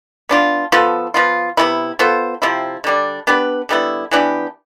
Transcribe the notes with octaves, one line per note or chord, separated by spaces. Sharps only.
B3 D4 F4
F3 B3 F4 A4
F3 B3 F4
C3 F3 B3 E4
B3 F4 A4 C5
C3 F3 C4 E4
D3 G3 D4
B3 D4 G4 B4
D3 G3 B3 E4
E3 B3 D4 G4